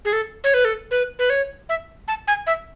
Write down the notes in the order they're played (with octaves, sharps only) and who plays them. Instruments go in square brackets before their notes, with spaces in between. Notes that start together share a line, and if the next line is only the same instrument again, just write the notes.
[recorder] G#4
A4
C#5
B4
A4
B4
B4
C#5
E5
A5
G#5
E5